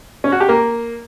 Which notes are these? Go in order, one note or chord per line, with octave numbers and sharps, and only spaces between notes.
C#4
F#4
G4
A#3